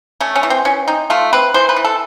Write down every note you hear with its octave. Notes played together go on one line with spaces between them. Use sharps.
A3 C#4
C#4
E3
C4
E3 C#4
C4 D#4
A3 F4
C4 B4
E3 C5
B4
E3
A4